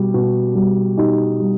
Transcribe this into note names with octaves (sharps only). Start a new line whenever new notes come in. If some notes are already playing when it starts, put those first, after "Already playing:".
Already playing: B2 G3 G4
B2
G3
B2 D#4 G4
G3